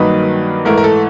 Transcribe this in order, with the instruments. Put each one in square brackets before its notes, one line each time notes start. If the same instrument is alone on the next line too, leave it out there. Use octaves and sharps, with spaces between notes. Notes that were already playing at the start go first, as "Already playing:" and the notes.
Already playing: [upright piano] G2 D#3 F#3 A#3 D#4 B4
G#2 E3 A3 A#4
A#4
A4